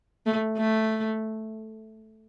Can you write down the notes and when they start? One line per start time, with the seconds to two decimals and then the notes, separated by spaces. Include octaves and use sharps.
0.26 A3
0.58 A3